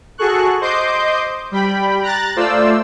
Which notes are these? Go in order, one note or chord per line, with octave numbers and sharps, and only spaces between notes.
F#4 G#4 A4 C#6 F#6
C5 D#5 C6 D6 G6
G3 G5 B5
A#5 F#6 A6
A3 F4 C5 D5 E6